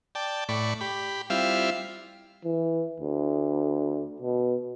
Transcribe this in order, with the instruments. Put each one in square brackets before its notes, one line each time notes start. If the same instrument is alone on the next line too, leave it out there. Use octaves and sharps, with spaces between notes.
[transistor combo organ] D5 G5 A5
A2 D5 B5 C#6
G4 B5
G3 C4 E4 F4 E5 F5
[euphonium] E3
D2
B2